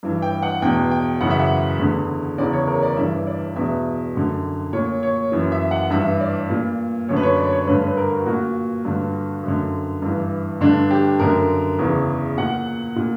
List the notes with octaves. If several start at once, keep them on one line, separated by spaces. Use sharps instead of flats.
G2 E3
G5
F#5
E2 B2 G5
G5
F#2 C#3 E3 F#5
E5
F#5
E2 D3
E2 C#3 E3 D5
C#5
A#4
D5
G2 E3 E5
D5
E2 B2 E5
F#2 D3
A#2 C#5
C#5
F#2 E3
E5
F#5
G2 E3 E5
D5
A#2
F#2 D3 C#5
B4
C#5
D5
C#5
G2 D3 B4
B4
A#4
F#4
A#2 F#4
G2 D3
F#2 D3
G2 E3
G2 D3 D4
G4
F#2 D3 A#4
E2 C#3 E3
A#2 F#5
A#2